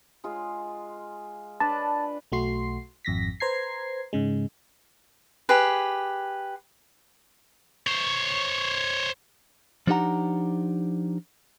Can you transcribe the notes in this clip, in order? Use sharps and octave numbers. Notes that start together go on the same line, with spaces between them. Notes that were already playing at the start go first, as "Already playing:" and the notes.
G#3 F4 G#4
D4 B4 A5
B1 A3 F#4 C6 C7
G#1 F2 A#6 B6
B4 C5 A#5 G#6 C7
G#2 C#3 G#3
G4 G#4 B4
C5 C#5
F3 D4 D#4 G4 F#5 A#5